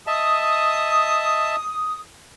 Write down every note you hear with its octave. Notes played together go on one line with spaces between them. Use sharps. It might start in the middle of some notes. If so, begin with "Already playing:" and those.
D#5 E5 A5 D#6